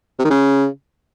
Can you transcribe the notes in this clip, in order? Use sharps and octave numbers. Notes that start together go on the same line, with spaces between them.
C3
D#3
C#3